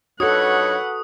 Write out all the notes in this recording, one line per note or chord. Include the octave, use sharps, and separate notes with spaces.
G2 D#4 F#4 A4 B4 C#5 F#5 D#6